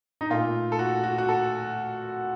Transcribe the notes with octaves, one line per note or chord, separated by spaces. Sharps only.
D#4
A#2 A3 F4
A4
F#4
F#4
F#4
A4